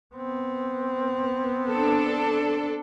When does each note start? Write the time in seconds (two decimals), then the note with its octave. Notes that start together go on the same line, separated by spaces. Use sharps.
0.15 B3 C4
1.69 D4 A4